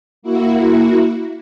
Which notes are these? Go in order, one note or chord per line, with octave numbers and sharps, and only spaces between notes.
A#3 E4 F#4